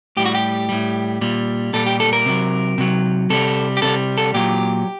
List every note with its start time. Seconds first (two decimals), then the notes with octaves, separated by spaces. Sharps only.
0.17 A2 G3 G4
0.25 F#4
0.35 G4
0.69 A2 G3
1.21 A#2 G3
1.73 A#2 G3 A4
1.86 G4
2.00 A4
2.13 A#4
2.26 C3 F#3
2.78 C3 F#3
3.30 C3 G3 A4
3.77 G4
3.82 C3 G3 A4
4.18 A4
4.34 A#2 F#3 G4